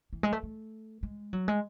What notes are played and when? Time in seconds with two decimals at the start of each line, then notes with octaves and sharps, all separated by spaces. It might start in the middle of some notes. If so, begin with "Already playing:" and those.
0.13 E3
0.23 G#3
0.33 A3
0.43 A3
1.03 G#3
1.33 F#3
1.48 G#3